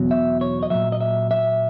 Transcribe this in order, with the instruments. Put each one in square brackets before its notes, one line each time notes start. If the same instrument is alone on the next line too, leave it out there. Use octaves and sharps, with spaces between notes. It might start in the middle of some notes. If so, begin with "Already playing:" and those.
Already playing: [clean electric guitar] E2 B2 F#3
E5
C#5
D#5
A#2 F#3 E5
D#5
E5
E5